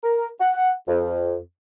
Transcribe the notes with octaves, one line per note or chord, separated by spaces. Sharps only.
A#4
F#5
F2